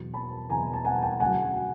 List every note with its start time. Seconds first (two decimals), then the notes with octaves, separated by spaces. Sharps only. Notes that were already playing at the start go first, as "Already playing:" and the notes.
Already playing: E2 B2 F#3
0.14 A5 B5
0.49 E2 B2 F#3 G#5 A#5
0.73 A5
0.85 F#5 G#5
1.03 G5 A5
1.20 D2 C#3 F#3 F#5 G#5